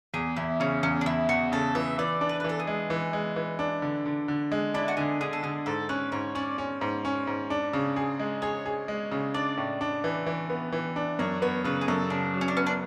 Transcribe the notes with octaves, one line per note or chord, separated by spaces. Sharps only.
E2 G#4
E2 E4
C#3 C#4
E2 C#4
D4
E2 E4
E2 F#4
C#3 A4
E3 E5
E3 D5
D4
B4
B4
E3 A4
G#4
G#3
E3
G#3
E3
D4
D3
D3
D3
G#3
D4 E4
F#4
D3 G#4
D3 G#4
A4
D3 G#4
G#2 A4
C#4 B4
G#2 C#5
C#4 D5
C#4
G#2
C#4
G#2
D4
C#3
G#4
G#3
G#4 C#5
G#4
G#3
C#3
D4 D5
A2
D4
E3
E3
B3
E3
D4
F#2 C#5
B3 C#5
C#3 B4
G#4
F#2 A4
C#3 D4
F#3
C#4
D4
B3 C#4
D4